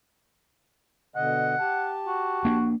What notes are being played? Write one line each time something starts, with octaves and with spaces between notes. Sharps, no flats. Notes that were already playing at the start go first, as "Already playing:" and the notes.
B2 D3 D#5 F#5
G4 A5
F#4
A#3 D4